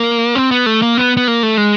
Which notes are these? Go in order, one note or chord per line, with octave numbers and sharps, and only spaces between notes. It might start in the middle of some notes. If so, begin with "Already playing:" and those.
Already playing: A#3
C4
B3
A3
A#3
B3
B3
A#3
A3
G#3